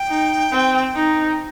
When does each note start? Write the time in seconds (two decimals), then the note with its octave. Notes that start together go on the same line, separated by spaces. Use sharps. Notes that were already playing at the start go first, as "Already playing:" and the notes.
Already playing: G5
0.08 D#4
0.51 C4
0.95 D#4